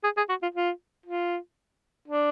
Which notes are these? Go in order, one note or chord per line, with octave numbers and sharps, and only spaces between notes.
G#4
G#4
F#4
F4
F4
F4
D4